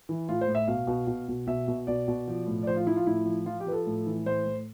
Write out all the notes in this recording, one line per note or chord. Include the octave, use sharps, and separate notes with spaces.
E3
A2 F4
C5
A2
E5
B2 F5
B2
B2
B2
B2 E5
B2
B2 D5
B2
F3
A2
D5
F3 C5
F4
F3 E4
F4
A2 E4
F3
F3 F4
G4
F3 B4
A4
A2
E3
A2 C5
A2